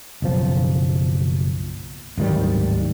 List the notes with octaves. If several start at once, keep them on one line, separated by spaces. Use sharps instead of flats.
F#1 B1 F3
D1 G#2 D#3 G3